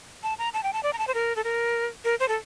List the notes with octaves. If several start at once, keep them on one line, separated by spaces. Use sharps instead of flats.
A5
A#5
A5
G5
A5
D5
A#5
A5
C5
A#4
A4
A#4
A#4
C5
A4